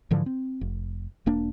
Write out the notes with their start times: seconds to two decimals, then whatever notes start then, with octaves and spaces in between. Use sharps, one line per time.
0.11 G#2 D3 E3 F3
0.26 C4
0.61 F1
1.26 E1 A#3 D4